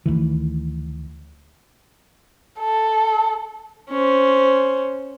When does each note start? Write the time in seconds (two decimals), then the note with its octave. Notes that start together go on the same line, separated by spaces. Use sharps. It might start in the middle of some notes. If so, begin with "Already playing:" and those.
0.06 D2 D#3 E3
2.60 A4
3.90 C#4 C5